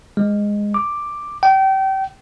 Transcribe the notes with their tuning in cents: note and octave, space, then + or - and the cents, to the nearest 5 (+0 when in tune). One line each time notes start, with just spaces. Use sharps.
G#3 -10
D6 +5
G5 -30